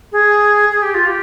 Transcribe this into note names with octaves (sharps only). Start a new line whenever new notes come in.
G#4
G#4
G4
F4
G4